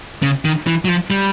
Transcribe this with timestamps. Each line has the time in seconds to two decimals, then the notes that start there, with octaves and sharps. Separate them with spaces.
0.22 C#3
0.45 D#3
0.67 E3
0.85 F#3
0.89 F3
1.10 G3